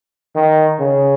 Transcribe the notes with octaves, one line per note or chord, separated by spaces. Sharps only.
D#3
C#3